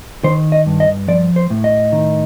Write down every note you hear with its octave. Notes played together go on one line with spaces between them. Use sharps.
D#3 C5
D#5
G2
D#5
F3 D5
C5
A2
D#5
D#3